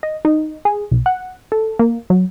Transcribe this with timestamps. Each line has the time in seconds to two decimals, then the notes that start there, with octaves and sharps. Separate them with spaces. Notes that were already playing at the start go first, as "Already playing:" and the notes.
0.03 D#5
0.25 D#4
0.65 G#4
0.91 B1
1.06 F#5
1.52 A4
1.79 A#3
2.10 F#3